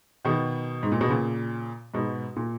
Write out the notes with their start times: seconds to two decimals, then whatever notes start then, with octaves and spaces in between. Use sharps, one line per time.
0.25 B2 D#3
0.83 G#2
0.92 A#2
1.01 B2
1.09 A#2 C#3
1.94 G#2 B2
2.36 A#2